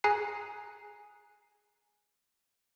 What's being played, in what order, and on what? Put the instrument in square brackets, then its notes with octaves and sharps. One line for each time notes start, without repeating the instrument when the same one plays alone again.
[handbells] G#4 G#5 A#5 F#6 C7